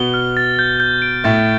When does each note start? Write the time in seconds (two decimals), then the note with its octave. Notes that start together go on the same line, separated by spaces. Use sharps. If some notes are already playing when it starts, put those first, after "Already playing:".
Already playing: B2 B3 G7
0.14 F6
0.37 A6
0.59 G6
0.80 G6
1.02 D7
1.24 A2 A3 A6